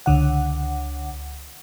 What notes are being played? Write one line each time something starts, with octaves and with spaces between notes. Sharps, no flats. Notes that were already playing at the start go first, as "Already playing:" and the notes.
C#2 D3 F#5